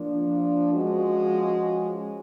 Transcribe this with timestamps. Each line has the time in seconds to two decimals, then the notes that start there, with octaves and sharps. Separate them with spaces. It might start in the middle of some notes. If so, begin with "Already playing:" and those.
Already playing: F3 A#3 D4
0.72 F3 G#3 C#4 F#4